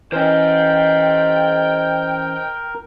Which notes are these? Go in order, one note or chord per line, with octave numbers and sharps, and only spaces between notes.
E3 C#4 A#4 C5 D#5 G5